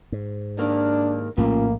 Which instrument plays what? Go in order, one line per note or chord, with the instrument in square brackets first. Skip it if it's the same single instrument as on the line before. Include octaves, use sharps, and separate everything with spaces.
[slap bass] G#2
[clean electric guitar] D#3 A#3 [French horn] D4
[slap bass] A#1 A2 A3 [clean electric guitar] C#3 F3 [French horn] A#3